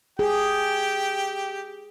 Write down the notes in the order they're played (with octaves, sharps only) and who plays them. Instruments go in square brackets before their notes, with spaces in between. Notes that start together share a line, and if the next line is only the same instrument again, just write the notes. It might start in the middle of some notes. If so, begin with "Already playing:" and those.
[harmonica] G4 G5 [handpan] G#4